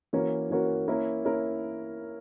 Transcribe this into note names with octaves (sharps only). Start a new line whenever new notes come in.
E3 A#3 C#4 F#4 A#4
E3 A#3 C#4 F#4 A#4
A#3 C#4 E4 A#4
A#3 C#4 E4 A#4